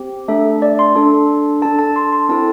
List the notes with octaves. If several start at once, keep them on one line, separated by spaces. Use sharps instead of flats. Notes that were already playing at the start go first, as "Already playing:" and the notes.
Already playing: C4 G4
A3 D4 A4 E5
D5
C6
D4 A4
D4 A4 A5
A5
C6
C6
C4 E4 A4 A5